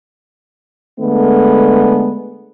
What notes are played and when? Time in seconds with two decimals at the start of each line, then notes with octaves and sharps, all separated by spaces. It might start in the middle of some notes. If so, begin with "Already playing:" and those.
0.99 D3 G#3 A3 B3